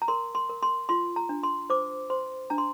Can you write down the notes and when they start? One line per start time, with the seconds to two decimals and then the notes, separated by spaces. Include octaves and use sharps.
0.02 A#5
0.08 A#4 C6
0.35 C6
0.49 A#4
0.63 C6
0.89 F4 C6
1.16 A#5
1.29 D4
1.43 C6
1.70 C5 D6
2.10 C5 C6
2.50 D4 A#5
2.58 C6